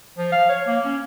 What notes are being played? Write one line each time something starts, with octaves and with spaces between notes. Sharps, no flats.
F3
F5
C#5
A#3
C#4